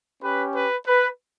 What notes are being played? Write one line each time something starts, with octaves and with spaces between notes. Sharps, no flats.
C#4 G4 B4
B4
B4